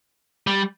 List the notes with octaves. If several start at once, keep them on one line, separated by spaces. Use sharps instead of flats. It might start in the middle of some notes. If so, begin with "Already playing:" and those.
G3